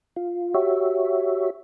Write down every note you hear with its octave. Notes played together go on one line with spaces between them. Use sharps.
F4
F#4 G4 C#5 E5